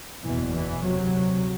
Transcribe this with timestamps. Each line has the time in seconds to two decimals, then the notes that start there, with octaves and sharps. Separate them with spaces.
0.23 F#1 E2 B2 E3
0.53 E3
0.83 D2 C3 F#3